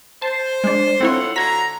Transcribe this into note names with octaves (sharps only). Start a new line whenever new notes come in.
C5 A5
G#3 D4
C4 E4 F4 A4 C#5 F#5
D3 F#4 A#5 G#6 B6